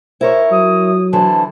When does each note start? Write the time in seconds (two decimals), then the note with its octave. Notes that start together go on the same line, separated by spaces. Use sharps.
0.21 E4 A#4 C5 C#5
0.51 F#3 D#6
1.13 D3 E3 C5 A5